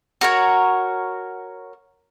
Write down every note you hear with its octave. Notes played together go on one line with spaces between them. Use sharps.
F#4 A#4 C#5